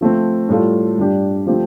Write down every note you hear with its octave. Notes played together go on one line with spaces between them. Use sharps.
F3 A3 C4
A2 G3 F4 A4
G2 G3 D4 G4
F3 A3 C4 G4